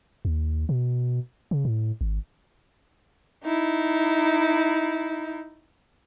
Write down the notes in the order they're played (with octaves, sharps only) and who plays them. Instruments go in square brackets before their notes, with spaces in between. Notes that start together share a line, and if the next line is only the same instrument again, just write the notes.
[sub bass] D#2
B2
C#3
A2
G#1
[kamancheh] D#4 E4